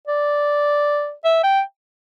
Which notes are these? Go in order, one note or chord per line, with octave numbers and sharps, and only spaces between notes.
D5
E5
G5